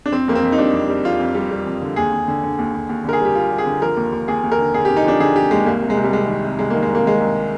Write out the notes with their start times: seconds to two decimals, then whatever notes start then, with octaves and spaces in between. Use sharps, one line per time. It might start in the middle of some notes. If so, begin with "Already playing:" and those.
0.06 D4
0.12 F2 C4
0.28 F2 A#3
0.35 C4
0.44 F2
0.52 D#4
0.58 G3 D4
0.73 F2
0.89 G3
1.05 F2 F4
1.20 F2
1.35 G3
1.51 G3
1.66 F2
1.82 D3
1.96 D#2 G#4
2.12 D#2
2.28 D3
2.43 D3
2.59 D#2
2.74 D#2
2.89 D#2
3.05 D3 A#4
3.13 G#4
3.21 G3 G4
3.35 G3 F4
3.51 G3
3.58 G#4
3.67 D3
3.82 F3 A#4
3.97 D#2
4.12 D#2
4.28 D#2 G#4
4.44 D#2
4.52 A#4
4.59 D3
4.74 D3 G#4
4.85 D3 G4
4.97 D#4
5.04 F3 D4
5.20 D3 G#4
5.35 D3 G4
5.51 D#2 G#3
5.66 C2 A#3
5.82 C3
5.90 G#3
5.97 C3
6.04 G3
6.13 C2 G#3
6.27 D#3
6.44 C3
6.59 C2 G#3
6.70 D#3 A#3
6.83 G#3
6.90 C2 A#3
7.06 D#3 G#3
7.20 C2